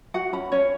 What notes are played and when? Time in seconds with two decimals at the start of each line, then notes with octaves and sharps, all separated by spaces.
0.14 F#4 F#5
0.33 C#4 B5
0.52 C#4 C#5